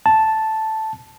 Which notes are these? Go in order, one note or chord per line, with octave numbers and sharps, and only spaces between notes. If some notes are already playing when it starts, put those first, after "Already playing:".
A5